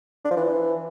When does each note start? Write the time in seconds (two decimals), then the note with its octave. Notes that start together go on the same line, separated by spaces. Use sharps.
0.25 D4
0.31 F3
0.37 E3